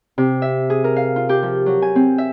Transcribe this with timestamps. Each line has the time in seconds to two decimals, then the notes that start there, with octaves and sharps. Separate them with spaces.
0.18 C3
0.42 E5
0.70 G#4
0.84 A#4
0.96 F5
1.16 F4
1.29 G4
1.42 F3
1.66 F#3
1.82 G#5
1.96 C4
2.18 E5